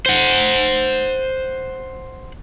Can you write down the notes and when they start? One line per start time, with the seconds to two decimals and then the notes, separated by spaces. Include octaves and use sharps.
0.06 C5 F#5